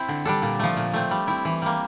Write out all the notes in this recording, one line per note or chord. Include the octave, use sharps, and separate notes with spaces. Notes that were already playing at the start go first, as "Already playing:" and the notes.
Already playing: C4 E4
D3
G3 D4 A4
A#2
F3 A3
A#2
A3 C4
G3
C4 E4
E3
G3 A#3